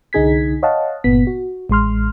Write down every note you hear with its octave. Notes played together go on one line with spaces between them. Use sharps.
C2 D3 D#4 G#4 G#6 B6
C#5 D#5 F5 F#5 A5
G1 A#2 B3 B6
F#4
A1 G#3 C6 F6